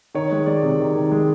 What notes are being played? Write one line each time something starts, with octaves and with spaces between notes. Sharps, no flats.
D#3 C#5
G#3
G#3 D5
C3
D#3
D#3
G#3